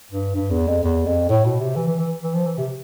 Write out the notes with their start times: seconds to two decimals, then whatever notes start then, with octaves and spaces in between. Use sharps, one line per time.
0.12 G2
0.35 G2
0.51 E2
0.68 F2
0.83 E2
1.06 F2
1.29 A2
1.45 B2
1.60 C3
1.76 E3
1.87 E3
1.99 E3
2.23 E3
2.34 F3
2.46 E3
2.58 C3